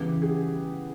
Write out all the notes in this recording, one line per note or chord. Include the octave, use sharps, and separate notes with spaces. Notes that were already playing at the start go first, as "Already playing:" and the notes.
Already playing: C#3 E3 G3 B3 G4
G#4